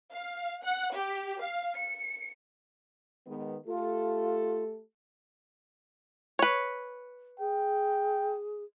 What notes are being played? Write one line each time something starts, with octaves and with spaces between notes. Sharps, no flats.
F5
F#5
G4
F5
C#7
D#3 G#3 B3
A3 F4 G4 A4
B4 C#5
G#4 G5